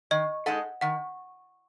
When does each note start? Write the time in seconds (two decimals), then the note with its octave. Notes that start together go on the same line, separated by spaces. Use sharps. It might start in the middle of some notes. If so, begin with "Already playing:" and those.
0.11 D#3 D#5
0.46 G#3 D#4 A4 D#5 F#5
0.81 D#3 F#5